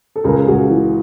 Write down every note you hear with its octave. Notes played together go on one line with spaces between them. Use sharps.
A4
C#2 G#4 A#4
C#2 F#4 G#4
E3